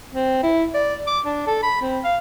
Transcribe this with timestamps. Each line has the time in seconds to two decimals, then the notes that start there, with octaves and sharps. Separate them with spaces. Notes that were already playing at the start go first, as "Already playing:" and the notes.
0.13 C4
0.43 E4
0.74 D5
1.07 D6
1.25 D4
1.47 A4
1.63 B5
1.81 C4
2.04 F5